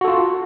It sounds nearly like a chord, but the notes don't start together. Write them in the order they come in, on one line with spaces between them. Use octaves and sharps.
F#4 A4 F4